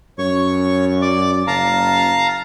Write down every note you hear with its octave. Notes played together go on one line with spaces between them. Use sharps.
F#2 C#5 C#6
D5 D6
F#1 F5 A5 A#5